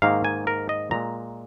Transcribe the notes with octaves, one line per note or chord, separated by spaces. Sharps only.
G#2 D#3 A#3 F5
G#5
A#4
D#5
A#2 G#3 A#5